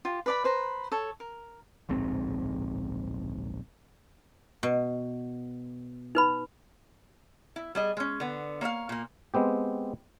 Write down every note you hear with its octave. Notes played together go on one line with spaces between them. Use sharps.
F4 G4
B4 D5 B5
B4 C5 A#5
A4 C#5
A#4
D1 A#1 G#2 C4
B2
D#4 B4 B5
E4
G3 G#4 D#5
G#3 C#4
D3 B3
A#3 C#5 E5 F5
A#2 A#3
G#3 B3 C4 G4